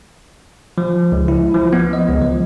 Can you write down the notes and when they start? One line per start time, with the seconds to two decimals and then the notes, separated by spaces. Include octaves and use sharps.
0.78 F3
1.12 C#2
1.28 E4
1.55 F3
1.73 B3
1.93 D#5
2.09 C#2
2.22 F3